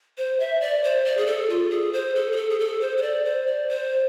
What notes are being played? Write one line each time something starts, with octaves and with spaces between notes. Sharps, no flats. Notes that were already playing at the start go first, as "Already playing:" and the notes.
C5
E5
D5
C5
D5
G#4
A4
F4
G#4
C5
A4
G#4
A4
G#4
A4
C5
C5
D5
C5
D5
C5